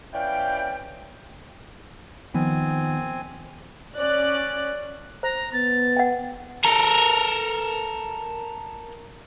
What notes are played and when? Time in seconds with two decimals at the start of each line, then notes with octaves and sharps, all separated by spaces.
0.14 C#4 E4 B4 D5 F5 G5
2.35 D#3 F3 B3 C4 G#5
3.98 C#4 D5 F#6
5.23 C5 A#5
5.53 B3 A6
5.97 F#5 G5
6.65 A4 A#4